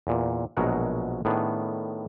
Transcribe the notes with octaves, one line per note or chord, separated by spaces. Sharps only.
E2 A#2
A#1 B2 F#3 G#3 A#4 F#5
A2 D#3 B3 D4 G#4